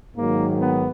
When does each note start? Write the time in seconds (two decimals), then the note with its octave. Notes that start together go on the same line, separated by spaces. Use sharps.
0.16 G#2 D#3 F#3 A#3
0.60 B3